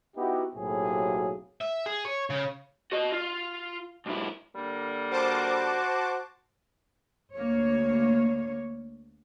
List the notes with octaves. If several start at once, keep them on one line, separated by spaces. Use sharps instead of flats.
B3 D#4 E4 F#4 G4
B1 A2 C3 F#3 A#3 G#4
E5
G#4
C#5
C#3
F#4 D#5
F4
B1 E4
D3 G3 A#3
F#4 C5 A5 D6
D2 A#3 C#5